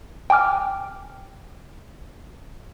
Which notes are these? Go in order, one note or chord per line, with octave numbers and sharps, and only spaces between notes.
G5 G#5 D6 F6